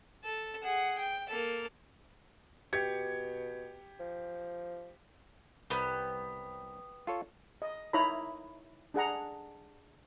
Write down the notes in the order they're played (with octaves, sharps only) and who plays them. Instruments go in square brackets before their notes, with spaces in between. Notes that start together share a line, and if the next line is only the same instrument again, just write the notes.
[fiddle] A4
G#4 F#5
G5
A#3 A4
[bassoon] B2 [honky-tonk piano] G4 G#6 C#7
[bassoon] F3
[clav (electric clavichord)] C2 [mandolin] B3 G4
[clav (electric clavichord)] F4 A4 C#5
[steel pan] D#5
D#4 E4 C#5 A#5 B5
D4 G#4 F#5 A#5